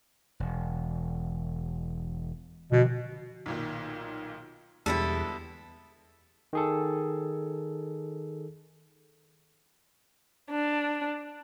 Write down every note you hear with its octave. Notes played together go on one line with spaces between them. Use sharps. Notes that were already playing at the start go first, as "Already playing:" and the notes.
E1
B2 D3 F3
B1 A#2 D#3
E2 B2 D3 G3 G#3 E4 A4
D#3 G#4 A4
D4